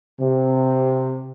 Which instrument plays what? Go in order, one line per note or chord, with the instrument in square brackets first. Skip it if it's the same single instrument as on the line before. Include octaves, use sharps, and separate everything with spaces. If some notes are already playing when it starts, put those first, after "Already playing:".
[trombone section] C3